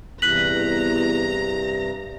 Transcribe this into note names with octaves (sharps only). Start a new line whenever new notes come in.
E2 G2 C3 A#5 F#6 B6 F#7